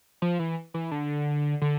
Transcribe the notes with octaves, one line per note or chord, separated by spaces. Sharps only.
F3
E3
E3
D3
D3